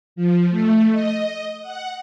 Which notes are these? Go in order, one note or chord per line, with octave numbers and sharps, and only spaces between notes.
F3
A3
D#5
F#5